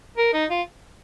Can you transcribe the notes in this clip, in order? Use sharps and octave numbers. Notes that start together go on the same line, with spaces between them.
A#4
D#4
F4